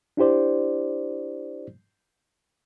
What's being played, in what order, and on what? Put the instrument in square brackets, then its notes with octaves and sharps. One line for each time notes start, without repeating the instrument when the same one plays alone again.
[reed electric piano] D4 E4 G4 C5 D5